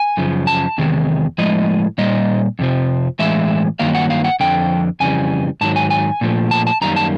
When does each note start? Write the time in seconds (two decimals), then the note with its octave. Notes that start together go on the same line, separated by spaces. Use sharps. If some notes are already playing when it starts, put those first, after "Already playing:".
Already playing: G#5
0.17 F#2 C#3 F3
0.47 A5
0.78 E2 C3 D#3 G#3
1.38 A2 F3 G#3 D#5
1.98 A#2 G3 D#5
2.59 F2 C3 F3
3.19 A2 E3 G#3 E5
3.79 G2 D#3 F#3 A#3 F5
3.95 F#5
4.10 F5
4.24 F#5
4.40 F2 D3 F3 G5
5.00 F2 C#3 E3 G3 G#5
5.61 G#2 D#3 F#3 A5
5.76 G#5
5.90 G#5
6.21 A#2 F3 A3
6.51 A5
6.67 A5
6.81 F#2 D#3 G3 A#3 A#5
6.96 A5